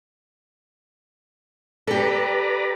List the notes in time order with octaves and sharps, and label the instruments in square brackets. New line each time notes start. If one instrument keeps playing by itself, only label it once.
[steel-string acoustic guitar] G4 A4 [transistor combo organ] B4 D5 A#5